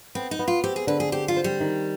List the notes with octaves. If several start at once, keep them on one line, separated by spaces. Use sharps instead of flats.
B3 C4
D#4
B3
F4
C4 G4
G#4
D3 B4
G#4
G4 C5
F4
C5
G3
D#3